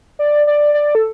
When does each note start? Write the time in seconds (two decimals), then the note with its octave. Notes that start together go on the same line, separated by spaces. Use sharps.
0.19 D5
0.47 D5
0.74 D5
0.95 A4